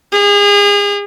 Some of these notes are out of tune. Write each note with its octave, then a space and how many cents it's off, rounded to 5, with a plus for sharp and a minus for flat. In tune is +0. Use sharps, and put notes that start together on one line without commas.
G#4 -35